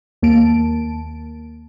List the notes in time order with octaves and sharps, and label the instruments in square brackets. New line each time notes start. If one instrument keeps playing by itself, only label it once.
[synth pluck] D#2 A#3 A5 D7